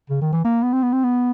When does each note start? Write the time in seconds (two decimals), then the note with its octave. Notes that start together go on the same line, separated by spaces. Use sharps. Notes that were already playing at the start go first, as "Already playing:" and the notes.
0.10 C#3
0.22 D#3
0.33 E3
0.45 A#3
0.63 B3
0.73 C4
0.83 B3
0.93 C4
1.04 B3